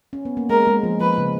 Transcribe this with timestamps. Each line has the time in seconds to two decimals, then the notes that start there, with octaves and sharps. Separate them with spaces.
0.13 C#4
0.25 B3
0.37 A#3
0.50 G#3 A#4
0.67 G#3
0.83 F3
1.01 F3 B4
1.18 C#3